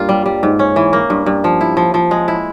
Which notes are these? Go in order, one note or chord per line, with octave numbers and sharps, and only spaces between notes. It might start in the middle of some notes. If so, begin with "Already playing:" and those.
Already playing: G2 A#3 F4
G3
G3
G#2
C#4
E3
A#3
G2
G2
F3
E4
F3
F3
G#3
E4